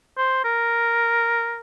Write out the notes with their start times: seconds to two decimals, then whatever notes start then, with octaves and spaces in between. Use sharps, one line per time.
0.18 C5
0.44 A#4